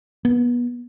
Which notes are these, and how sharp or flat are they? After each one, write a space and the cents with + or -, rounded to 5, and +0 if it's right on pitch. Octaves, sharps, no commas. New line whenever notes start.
B3 -30